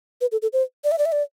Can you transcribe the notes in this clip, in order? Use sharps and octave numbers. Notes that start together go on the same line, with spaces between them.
B4
A4
A4
C5
D5
E5
D5
E5
D5